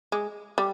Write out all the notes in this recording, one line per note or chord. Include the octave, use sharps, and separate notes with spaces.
G#3
G3